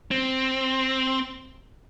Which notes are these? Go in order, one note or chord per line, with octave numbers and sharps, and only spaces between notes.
C4